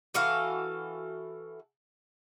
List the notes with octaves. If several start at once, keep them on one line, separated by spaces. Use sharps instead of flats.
E3 F#4 A4 F5